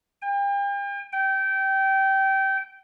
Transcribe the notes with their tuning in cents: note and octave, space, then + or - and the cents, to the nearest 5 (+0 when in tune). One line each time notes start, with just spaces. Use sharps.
G5 +40
G5 -20